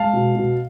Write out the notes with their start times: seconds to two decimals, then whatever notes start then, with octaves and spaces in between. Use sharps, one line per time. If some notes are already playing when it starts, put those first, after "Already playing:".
Already playing: G#3 F5 A5
0.13 B2
0.36 B2